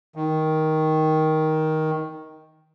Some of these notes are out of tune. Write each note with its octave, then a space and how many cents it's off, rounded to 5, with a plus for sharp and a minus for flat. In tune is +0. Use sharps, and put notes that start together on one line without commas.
D#3 +10